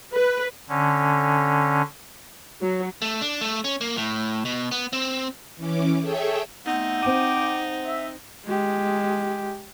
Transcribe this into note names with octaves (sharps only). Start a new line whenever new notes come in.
B4
D3 C#4
F#3
A3
D4
A3
C#4
A#3
A2
B2
B3
C4
E3 C#4 D6
G#4 A4 C#5 E5 G5
A3 B3 C4 D#4 F#5
C4 G5 D6 D#7
E5
G#3 G4